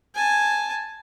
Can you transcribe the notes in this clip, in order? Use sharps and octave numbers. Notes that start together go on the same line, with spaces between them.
G#5 A5